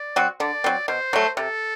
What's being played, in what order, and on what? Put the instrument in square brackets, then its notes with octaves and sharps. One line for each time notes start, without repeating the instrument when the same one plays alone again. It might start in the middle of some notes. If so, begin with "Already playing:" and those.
Already playing: [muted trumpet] D5
[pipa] F#3 C4 F#4
[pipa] D3 [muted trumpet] D5
[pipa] F#3 C4
[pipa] B2 [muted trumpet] C5
[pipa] F#3 A3
[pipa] C3 [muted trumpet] A4